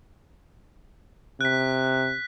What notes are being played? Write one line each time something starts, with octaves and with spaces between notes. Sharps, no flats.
C3 F#6 B6